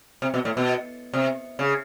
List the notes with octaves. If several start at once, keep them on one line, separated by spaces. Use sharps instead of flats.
C3
B2
A2
B2
C3
C#3